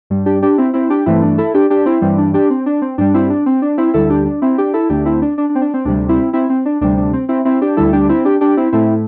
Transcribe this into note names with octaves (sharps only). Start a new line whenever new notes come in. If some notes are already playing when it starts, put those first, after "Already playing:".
G2 G3
D4 G4
D4 G4
C4 E4
C4 E4
D4 G4
G2 E3 A3 C4 E4
D4
E4 A4
D4 G4
D4 G4
C4 E4
G2 E3 G3 C4
D4
D4 G4
C4
D4
C4
G2 G3 D4
C4 E4
D4
C4
D4
C4 E4
D2 D3 G3 E4 A4
D4 G4
D4
C4 E4
D4 G4
E4 A4
D2 D3 A3 D4 G4
C4 E4
D4
D4
D4
C4
D4
C4
D2 C3 G3 D4
C4 E4
C4 E4
C4
D4
D2 C3 G3 D4
D4
C4
C4 E4
C4 E4
D4 G4
D2 D3 G3 E4 A4
D4 G4
C4 E4
D4 G4
D4 G4
C4 E4
A2 A3 C4 E4